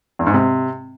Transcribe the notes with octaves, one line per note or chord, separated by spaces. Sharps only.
E2
G#2
C3